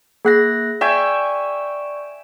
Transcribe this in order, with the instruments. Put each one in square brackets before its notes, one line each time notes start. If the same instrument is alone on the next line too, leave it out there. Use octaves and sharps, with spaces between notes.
[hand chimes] A#3 F#6 A#6 [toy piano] G#4 F#5
[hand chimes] D5 C#6 [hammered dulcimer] E5 G5 G#5